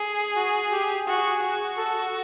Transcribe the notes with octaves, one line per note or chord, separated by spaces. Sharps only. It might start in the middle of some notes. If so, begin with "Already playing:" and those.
Already playing: G#4
F#4
G4
F#4 G#4
F#4
A4